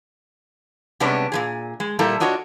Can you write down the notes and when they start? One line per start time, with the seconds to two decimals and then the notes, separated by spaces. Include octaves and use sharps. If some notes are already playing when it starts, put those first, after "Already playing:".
1.00 C3 G3 G#3 B3 C#4 D4
1.32 A#2 F3 G#4
1.80 G#3
1.99 A#2 G3 E4 A4 A#4
2.20 D4 F4 F#4 C#5 D#5